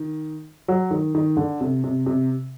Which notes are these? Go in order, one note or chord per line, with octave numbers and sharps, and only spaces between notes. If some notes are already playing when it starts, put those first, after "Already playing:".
Already playing: D#3
F#3
D#3
D#3
D3
C3
C3
C3